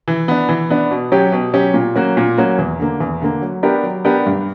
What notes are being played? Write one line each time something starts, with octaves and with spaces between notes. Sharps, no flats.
E3
B3 D4
E3
B3 D4
B2
F#3 C#4 G4
B2
F#3 C#4 G4
A#2
F#3 A#3 C#4 F#4
A#2
F#3 A#3 C#4 F#4
E2
D3 A#3
E2
D3 A#3
F#3
B3 D4 G4 A#4
F#3
B3 D4 G4 A#4
G2